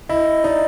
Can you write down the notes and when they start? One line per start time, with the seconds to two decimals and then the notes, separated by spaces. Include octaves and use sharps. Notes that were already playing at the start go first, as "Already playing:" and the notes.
0.09 E4 D#5
0.44 D#4 D5